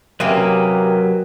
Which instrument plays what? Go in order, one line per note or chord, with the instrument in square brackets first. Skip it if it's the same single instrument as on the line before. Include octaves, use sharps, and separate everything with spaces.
[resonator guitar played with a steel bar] C3 A#3 C#4 [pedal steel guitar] F#3 B4 D#5 [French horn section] G4 A#4